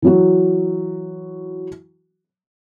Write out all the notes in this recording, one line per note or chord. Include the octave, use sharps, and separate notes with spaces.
E3 F#3 F#4